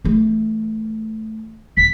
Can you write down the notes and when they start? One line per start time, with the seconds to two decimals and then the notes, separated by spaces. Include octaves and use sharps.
0.05 E3 A3
1.77 D#1 D#2 B6